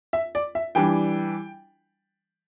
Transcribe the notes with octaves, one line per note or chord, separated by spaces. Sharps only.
E5
D5
E5
E3 G3 D4 G5